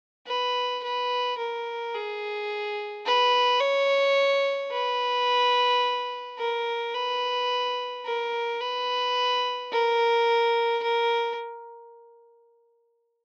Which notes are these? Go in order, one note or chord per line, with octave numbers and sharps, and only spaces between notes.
B4
B4
A#4
G#4
B4
C#5
B4
A#4
B4
A#4
B4
A#4
A#4